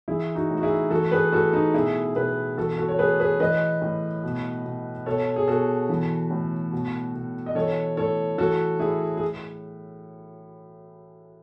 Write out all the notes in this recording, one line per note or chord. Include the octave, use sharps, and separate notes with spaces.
E3 E4 G#4
D#4 F#4
A2
F#4
E4 G#4
E3 F#4 A4
G#4 B4
A2 F#4 A4
D#4 F#4
B2 E4 G#4
B2 G#4 B4
E3 F#4 A4
F#4 A4
C#5
A2 G#4 B4
G#4 B4
E3 B4 D#5
A2
B2
B2
B2 A4 C#5
G#4
B2 F#4 A4
E3
A2
B2
B2
D#5
E3 A4 C#5
A2 A4 C#5
E3 F#4 A4
A2 E4 G#4
G#4